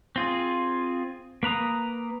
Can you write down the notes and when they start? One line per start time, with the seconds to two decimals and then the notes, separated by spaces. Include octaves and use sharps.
0.16 C4 F4 G#4
1.43 A#3 B4 A#5 D#6